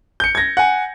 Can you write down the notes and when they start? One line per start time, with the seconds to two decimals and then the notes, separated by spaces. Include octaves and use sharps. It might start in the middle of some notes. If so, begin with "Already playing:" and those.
0.20 G6 C#7
0.35 G#6 A#6
0.57 F#5 G#5